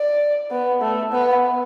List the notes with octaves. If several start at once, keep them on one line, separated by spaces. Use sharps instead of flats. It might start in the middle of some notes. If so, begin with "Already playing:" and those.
Already playing: D5
B3
A3
B3